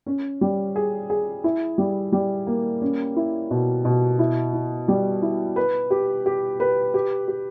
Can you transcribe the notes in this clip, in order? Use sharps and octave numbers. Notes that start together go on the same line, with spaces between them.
C#4
G3
G#4
G#4
E4
G3
G3
A#3
C#4
E4
B2
B2
E4
E4
G3
E4
B4
G4
G4
B4
G4
G4